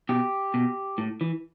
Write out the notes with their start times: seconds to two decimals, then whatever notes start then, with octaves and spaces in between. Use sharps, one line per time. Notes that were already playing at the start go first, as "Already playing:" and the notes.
0.09 B2 G4
0.54 B2
0.98 A2
1.21 E3